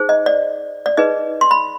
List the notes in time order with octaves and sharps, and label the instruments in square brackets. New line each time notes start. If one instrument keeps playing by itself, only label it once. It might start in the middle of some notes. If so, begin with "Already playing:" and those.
Already playing: [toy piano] D#4 G#4 C5
D#5
D5
D5
D#4 G#4 B4 D#5
C6
B5